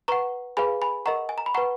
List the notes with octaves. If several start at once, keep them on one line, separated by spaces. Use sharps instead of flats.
B4 F#5 A#5 C#6
G#4 B4 F5 G#5 B5
G#5 B5
A#4 D#5 F#5 A#5 C#6
G#5
A#5
B5
B4 F#5 A#5 C#6